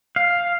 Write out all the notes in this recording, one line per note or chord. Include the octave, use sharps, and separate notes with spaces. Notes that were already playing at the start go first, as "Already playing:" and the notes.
F5